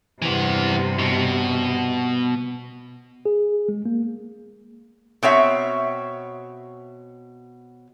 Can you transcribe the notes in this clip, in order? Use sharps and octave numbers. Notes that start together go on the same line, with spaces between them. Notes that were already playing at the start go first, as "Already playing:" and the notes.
G2 C3 E3 B3
B2
G#4
G#3
A#3
B2 C4 C#5 E5